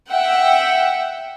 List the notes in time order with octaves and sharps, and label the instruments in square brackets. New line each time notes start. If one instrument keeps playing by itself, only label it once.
[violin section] E5 F#5 G5